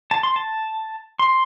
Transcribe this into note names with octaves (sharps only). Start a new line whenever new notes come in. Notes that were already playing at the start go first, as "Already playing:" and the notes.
A5
C6
A5
C6